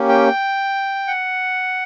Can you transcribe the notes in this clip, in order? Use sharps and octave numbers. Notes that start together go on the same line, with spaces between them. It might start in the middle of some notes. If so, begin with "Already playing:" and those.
Already playing: A#3 C#4 G4
G5
F#5